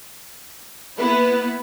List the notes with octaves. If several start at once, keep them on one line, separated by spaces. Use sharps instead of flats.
A#3 B3 E4 B4